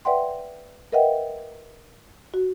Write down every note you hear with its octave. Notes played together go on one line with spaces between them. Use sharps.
B4 D5 E5 F#5 G5 C6
A#4 B4 D#5 E5 F#5 G5
F#4